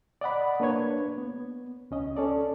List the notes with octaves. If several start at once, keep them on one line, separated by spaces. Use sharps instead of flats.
D5 D#5 F#5 B5
A#3 D4 B4 C#5 G#6
B3
C#2 C#4 D#5
C#4 A4 D5